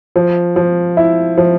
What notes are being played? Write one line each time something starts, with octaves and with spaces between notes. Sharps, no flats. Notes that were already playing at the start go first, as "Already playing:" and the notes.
F3
F3
E4
F3